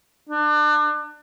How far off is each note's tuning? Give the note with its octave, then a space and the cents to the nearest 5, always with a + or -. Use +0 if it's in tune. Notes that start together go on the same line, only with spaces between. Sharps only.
D4 +30